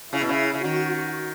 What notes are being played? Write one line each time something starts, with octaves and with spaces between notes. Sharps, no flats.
C#3 E4
B2
C#3
C#3
D#3 F#4